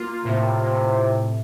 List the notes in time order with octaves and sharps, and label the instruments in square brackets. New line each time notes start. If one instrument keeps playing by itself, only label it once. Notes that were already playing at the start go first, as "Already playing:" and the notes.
Already playing: [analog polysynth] A#3 F4
[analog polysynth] A2 [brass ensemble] C3
[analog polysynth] A2